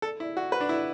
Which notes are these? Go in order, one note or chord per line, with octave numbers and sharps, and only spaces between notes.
A4
E4
F#4
B4
D4
E4